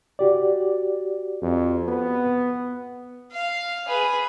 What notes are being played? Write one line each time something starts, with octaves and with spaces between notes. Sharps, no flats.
F#4 G4 D5
F2
B3
F5
G#4 B4